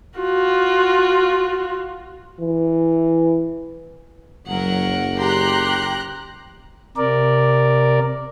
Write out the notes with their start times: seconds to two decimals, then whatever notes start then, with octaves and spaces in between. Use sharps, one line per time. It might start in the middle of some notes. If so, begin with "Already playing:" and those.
0.19 F4 F#4
2.40 E3
4.47 F#1 F#3 A#4 F#5
5.19 G4 A#5 C6 F#6
6.97 C3 A#4 D5